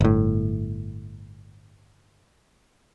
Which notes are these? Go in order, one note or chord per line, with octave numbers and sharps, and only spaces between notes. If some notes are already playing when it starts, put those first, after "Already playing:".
G1 A2